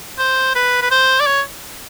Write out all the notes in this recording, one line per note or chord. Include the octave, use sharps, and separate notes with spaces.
C5
B4
B4
C5
D5
C#5